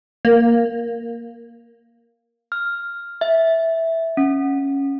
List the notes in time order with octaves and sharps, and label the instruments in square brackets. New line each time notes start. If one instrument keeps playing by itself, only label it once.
[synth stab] A#3
[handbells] F6
E5
C#4